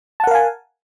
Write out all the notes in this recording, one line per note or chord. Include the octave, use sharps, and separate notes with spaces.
A#4 F5 F#5 G#5 A5